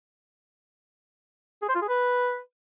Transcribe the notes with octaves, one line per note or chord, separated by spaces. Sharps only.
G#4
C5
F4
G#4
B4